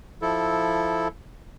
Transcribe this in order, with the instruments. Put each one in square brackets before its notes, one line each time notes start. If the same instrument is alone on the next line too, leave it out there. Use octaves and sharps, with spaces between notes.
[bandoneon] F3 E4 A4